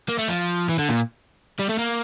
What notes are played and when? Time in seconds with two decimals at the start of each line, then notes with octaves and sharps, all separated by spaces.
0.09 A#3
0.19 A3
0.28 F3
0.69 E3
0.79 D3
0.89 A#2
1.59 G3
1.69 A3
1.78 A#3